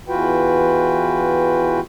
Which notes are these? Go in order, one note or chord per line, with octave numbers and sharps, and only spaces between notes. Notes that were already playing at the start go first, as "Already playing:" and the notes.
E2 E3 F4 F#4 B4 G5